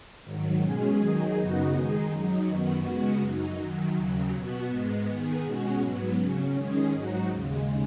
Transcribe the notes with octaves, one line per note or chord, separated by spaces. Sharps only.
G#2 D#3 F#3
B2 G#3 C#4 G#4
D#3 F#3 D#4 G#4
F#2 C#3 B3 D#4 F#4
D#3 G#3 D#4 G#4
F#2 F#3 D#4
F#2 D#3 B3 F#4
C#3 G#3 B3 F#4
F#2 F#3 D#4
F#2 D#3 F#3
D#2 C#3 F#3
B2 B3 F#4
G#2 G#3 B3
D#3 B3 G#4
B2 G#3 C#4 F#4
G#2 F#3 B3
C#3 F#3 C#4
D#3 G#3 C#4 G#4
G#2 F#3 D#4 F#4
D#2 C#3 G#3